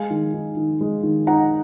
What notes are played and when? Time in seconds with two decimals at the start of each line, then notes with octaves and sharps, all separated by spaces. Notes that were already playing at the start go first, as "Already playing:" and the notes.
Already playing: G#3 F5 G#5
0.10 D#3
0.33 D#4
0.57 D#3
0.81 G#3
1.03 D#3
1.27 D#4 F#5 A#5